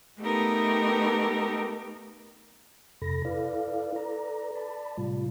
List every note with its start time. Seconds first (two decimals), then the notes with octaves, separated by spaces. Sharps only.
0.21 A3 B3 D#4 G4 A4 A#4
3.02 F2 C3 A4 B5 A#6
3.25 E4 A4 B4 D5 F5
3.96 A4 B4 D5 A#5
4.55 D5 A5 B5
4.97 A2 C3 G3 F4